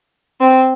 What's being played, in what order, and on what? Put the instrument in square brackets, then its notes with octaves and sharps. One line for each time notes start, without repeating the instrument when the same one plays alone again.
[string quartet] C4